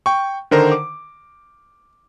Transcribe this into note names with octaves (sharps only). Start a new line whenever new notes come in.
G5 C#6
D3 D#3 A#4 C5 A#5
D6